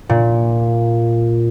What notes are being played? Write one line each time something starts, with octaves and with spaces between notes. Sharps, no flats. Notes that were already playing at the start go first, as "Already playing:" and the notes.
A#2